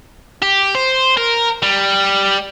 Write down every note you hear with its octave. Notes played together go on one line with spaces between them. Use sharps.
G4
C5
A#4
G3